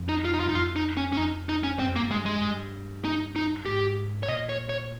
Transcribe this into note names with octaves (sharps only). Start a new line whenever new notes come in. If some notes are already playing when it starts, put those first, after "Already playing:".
Already playing: F2
D#4
F4
D#4
F4
G2 D#4
F2 F4
D#4
C#4
C#4
F2 D#4
D#4
C#4
G2 C4
F2
A#3
G2
G#3
G#3
G2
D#4
D#4
G#2 G4
C#5
A#2 D#5
C#5
C#5